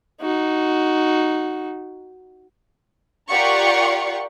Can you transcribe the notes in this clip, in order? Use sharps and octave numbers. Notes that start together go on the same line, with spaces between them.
D#4 F#4
F4 G4 A#4 D5 F#5 C#6